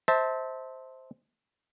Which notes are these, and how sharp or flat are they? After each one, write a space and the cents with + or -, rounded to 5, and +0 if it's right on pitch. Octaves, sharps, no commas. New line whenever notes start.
C5 +0 E5 -30 A5 +10